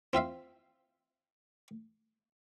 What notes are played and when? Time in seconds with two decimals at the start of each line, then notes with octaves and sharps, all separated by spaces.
0.13 C4 F4 E5 F5